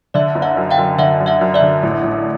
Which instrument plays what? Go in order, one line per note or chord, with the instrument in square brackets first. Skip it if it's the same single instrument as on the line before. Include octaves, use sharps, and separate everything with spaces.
[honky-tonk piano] D3 [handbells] D5 E5
[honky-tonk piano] F#1
[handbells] E5 F#5
[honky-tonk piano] F#2
[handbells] F5 G5
[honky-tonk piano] F#2
[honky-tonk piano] D3 [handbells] E5 F#5
[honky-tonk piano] F#2
[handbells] E5 F#5
[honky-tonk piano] F#2
[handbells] D5 E5
[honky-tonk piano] D3
A1
A1